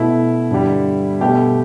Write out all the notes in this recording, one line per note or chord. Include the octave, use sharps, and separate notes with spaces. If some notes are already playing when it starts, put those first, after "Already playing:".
Already playing: B2 A3 E4
G2 D3 G3
B2 A3 G4